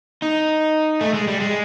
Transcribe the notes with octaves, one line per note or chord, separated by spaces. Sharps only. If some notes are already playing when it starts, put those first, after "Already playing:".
D#4
A3
G#3
G3
G#3